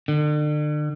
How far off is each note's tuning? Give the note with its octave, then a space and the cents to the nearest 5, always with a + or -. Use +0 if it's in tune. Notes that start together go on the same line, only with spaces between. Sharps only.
D3 +40